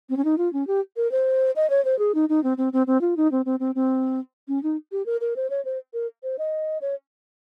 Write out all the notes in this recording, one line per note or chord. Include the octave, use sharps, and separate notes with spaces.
C4
C#4
D#4
F4
C#4
G4
A#4
C5
D#5
C#5
C5
G#4
D#4
D#4
C4
C4
C4
C4
F4
D#4
C4
C4
C4
C4
C#4
D#4
G4
A#4
A#4
C5
C#5
C5
A#4
C5
D#5
C#5